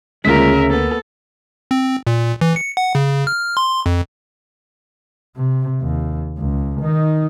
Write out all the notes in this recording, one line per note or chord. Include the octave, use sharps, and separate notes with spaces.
D2 C#3 G#3 A#3 F4 A#4 E5 B6
A#3 B3 A4
C4
A#2
E3
C#7
F#5
C#3
F6
C6
F2
C3
D#2
C#2
D#3 D#4